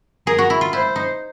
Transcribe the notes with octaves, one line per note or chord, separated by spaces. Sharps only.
G#4 A#4
F#4
E4
F4
E4 C5
D#4